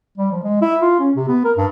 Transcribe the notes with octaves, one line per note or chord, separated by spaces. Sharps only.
G3
F3
G#3
E4
F4
C#4
C3
B3
A#4
G2